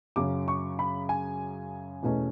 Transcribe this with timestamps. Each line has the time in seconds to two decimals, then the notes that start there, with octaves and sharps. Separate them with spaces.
0.16 F#2 C#3 F#3 C#4 D6
0.48 C#6
0.79 B5
1.09 G#5
2.03 E2 B2 A3 C#4